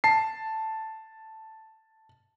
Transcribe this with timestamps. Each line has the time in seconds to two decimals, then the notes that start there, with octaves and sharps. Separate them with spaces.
0.04 A5 C7